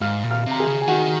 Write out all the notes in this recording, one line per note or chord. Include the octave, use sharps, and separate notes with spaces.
G#2 F5 F6
A#2
F5 F6
C3
A#5
G#4 G#5
C#3
G#5
D#3 F#4 F#5